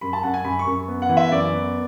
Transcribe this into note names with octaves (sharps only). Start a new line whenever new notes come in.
F#2 B5
A5
F#2 F#5
G#5
F#2 B5
C#6
F#2
B3
F#5
E3
E5
F#2 D5
B3